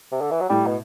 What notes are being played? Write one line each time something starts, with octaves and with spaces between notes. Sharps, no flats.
C3
D3
E3
F#3
A2 G3
B2